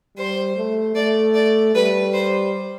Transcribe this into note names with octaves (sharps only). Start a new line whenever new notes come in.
G3 C5
A3
A3 D5
D5
G3 B4
C5